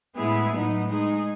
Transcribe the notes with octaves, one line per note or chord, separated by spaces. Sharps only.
A2 G#3 B3 E4 G#4
A2 F#3 B3 D#4
G#3 D#4 G#4